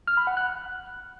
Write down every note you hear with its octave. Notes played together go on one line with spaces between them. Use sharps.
F6
B5
F#5
F#6